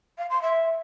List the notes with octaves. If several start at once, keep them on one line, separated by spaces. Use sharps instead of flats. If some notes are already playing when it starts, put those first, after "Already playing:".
F5
C6
E5